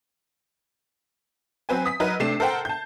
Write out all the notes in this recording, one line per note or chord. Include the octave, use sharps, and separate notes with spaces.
F#3 C4 B4 G#5
D#6 B6
F#3 D#4 A#4 B4 D#7
C3 A3 D4 C7 E7
A4 A#4 C5 F#5 G5
A5 G6